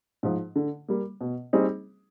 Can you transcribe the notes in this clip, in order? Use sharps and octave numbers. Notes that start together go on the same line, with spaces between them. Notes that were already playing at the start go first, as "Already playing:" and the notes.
G#2 F3
D3
G3 A#3
B2
G3 C4 D#4 G#4